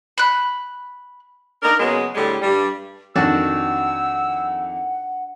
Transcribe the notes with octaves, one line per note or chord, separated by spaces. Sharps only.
B5 F#6
D4 D#4 A#4
C#3 F#3 G#3 A#3 B3
A2 D3 G3 G#3 G4
G2 G3
F2 D#3 D4 F#4 F#5 E6